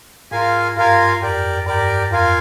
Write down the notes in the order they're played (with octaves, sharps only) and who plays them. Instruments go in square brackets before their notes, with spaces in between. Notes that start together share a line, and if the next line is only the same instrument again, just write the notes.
[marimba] G#2 [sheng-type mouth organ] F4 A#4 F5 G#5
[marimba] G2 [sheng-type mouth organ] F4 A#4 F5 G#5
[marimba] F2 [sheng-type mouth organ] G4 A#4 D5
[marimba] G2 [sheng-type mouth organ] G4 A#4 D5
[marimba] F2 [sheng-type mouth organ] F4 A#4 F5 G#5